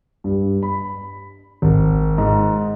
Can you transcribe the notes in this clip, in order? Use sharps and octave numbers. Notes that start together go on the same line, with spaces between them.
G2
B5
G#1
G#2